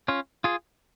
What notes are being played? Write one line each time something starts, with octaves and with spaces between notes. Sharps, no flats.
C#4 F4
F4 G#4